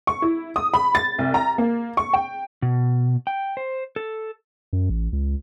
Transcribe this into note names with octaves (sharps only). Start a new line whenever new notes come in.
C#6
E4
D#6
B5
A6
C2
A#5
A#3
C#6
G5
B2
G5
C5
A4
F#2
A1
C#2